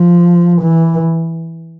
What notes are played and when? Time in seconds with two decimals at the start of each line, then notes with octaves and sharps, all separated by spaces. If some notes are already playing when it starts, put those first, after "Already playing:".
Already playing: F3
0.62 E3